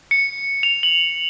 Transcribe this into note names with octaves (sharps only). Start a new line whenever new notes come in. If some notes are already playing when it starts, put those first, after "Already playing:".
C#7
F7
F#7